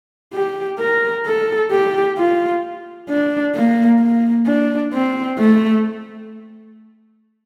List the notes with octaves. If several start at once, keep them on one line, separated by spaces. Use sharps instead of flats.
G4
A#4
A4
G4
F4
D4
A#3
A#3
D4
C4
A3